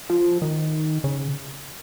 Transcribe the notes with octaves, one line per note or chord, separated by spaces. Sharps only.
F3
D#3
C#3